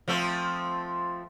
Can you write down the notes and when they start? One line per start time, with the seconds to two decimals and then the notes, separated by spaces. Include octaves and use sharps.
0.08 F3 A3 C4